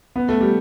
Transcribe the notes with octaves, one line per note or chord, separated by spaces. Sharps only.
B3
A3
G3